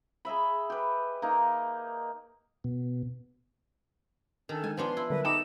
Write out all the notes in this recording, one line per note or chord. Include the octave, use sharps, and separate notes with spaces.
G#4 D#5 E5 B5
G4 B4
A#3 D#4
B2
D#3 C#4 D4 A4
D#3 G#3 G#5
F3 B3 D4 C6
E4
D3 F#3 G3 A#4 B4
D#4 A4 G5 B5 D6 E7